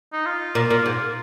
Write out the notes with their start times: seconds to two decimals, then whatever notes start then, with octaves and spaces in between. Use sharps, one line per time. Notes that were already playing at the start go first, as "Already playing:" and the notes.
0.13 D#4
0.26 F4
0.55 A#2
0.70 A#2
0.86 G#2